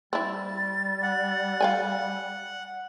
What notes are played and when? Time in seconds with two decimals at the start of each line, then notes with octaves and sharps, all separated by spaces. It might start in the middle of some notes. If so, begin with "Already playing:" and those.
0.13 G3 C4 E4 A6
1.03 F#5
1.61 F5 G5 G#5